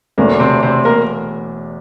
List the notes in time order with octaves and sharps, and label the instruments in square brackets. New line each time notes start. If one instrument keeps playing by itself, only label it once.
[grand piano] E1 E2 D3 A3 D4 [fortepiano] A#3
[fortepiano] C3 C4
C3 C4
A#3 A#4